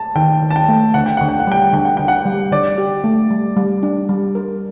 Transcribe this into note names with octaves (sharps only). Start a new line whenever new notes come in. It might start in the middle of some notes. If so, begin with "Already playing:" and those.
Already playing: A5
D#3 G5
D#3
A5
G5
A3
D3 F#5
G5
D3 F#5
G5
F#5
G3 G5
F#5
D3 G5
F#5
D3 G5
F#5
G3
D3 D5
G4
A3
G3
G3
D4
G3
A#4